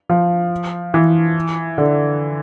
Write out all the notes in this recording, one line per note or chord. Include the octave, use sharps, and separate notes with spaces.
F3
E3
D3